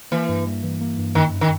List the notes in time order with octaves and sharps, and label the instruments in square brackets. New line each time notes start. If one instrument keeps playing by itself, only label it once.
[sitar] E3 [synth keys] A#3
[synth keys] G2
G3
E3
A#3
G2
[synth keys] F#2 [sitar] D#3
[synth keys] F#2
[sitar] D#3